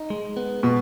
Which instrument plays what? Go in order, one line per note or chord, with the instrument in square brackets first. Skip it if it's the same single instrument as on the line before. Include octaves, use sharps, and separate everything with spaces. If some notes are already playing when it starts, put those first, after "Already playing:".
Already playing: [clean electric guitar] D#4
G#3
B3
[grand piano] B2 [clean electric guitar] B3